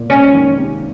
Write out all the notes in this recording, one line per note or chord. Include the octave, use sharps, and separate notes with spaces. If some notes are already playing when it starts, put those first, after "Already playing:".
Already playing: A#2
G#3 C#4
D#3
C3